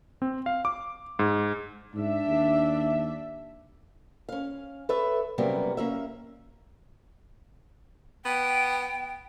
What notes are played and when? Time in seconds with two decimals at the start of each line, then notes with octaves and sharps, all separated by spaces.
0.22 C4
0.46 F5
0.65 D6
1.19 G#2
1.95 G#2 D4 E5
2.27 D#2
4.29 C#4 F5
4.89 A4 B4 C#5 E5
5.38 C3 F#3 G3 A#3 B3 C#4
5.77 A#3 C#4 E5
8.25 B3 G5